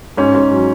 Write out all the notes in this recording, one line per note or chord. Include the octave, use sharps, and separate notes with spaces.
G#2 C#4
G#2
F#3